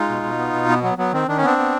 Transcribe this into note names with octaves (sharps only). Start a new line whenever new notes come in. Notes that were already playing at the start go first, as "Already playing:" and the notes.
Already playing: G#3 D#4 F4
B2
B2
B3
B2
B3
F#3 B3
F#3 B3
D#3 C4
D#3 D4
C#4
B3 C4 D4
B3